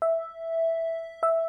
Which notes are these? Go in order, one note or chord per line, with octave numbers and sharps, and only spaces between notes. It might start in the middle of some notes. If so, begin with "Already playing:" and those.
E5
E5